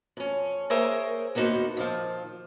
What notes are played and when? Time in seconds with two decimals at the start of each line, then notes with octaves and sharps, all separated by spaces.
0.17 F2 C#4
0.70 A#3 G#4 A#4 C5 C#5 E5
1.35 D2 A#3 B3 D#4 F#4 C5
1.77 A#2 D#3 F3